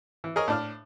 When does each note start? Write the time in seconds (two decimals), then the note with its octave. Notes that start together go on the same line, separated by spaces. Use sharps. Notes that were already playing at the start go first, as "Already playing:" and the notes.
0.24 E3
0.36 G#4 A#4 C#5 D#5
0.48 A2 D4 F6